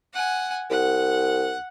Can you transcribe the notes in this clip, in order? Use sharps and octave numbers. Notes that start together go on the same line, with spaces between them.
F#5 G#5
C2 F#5